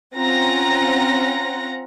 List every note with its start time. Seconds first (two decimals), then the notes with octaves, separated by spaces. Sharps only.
0.15 C4 C#4 F4 F#5 A#5 A#6